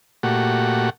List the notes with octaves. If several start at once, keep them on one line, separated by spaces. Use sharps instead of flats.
A#2 A3 F#4 G4 F#5